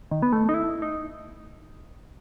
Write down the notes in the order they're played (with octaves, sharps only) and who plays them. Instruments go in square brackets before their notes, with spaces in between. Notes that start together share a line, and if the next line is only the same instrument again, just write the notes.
[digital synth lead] D#3
B3
A3
D#4
E4
D#4